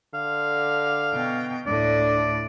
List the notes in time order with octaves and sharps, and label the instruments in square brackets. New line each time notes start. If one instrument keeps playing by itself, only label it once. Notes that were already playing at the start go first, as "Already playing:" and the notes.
[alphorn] D3 [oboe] F5
[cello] B2 G5
[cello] D2 A2 [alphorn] D4 [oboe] D5